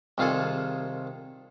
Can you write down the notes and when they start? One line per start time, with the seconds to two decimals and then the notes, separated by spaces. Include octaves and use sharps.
0.18 C2 D#3 F4 G#4 A4